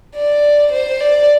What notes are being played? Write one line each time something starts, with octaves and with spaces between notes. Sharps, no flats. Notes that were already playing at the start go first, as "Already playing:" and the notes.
D5
C5
D5